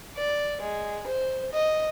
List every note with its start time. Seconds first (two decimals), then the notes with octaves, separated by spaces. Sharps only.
0.17 D5
0.62 G#3
1.07 C5
1.52 D#5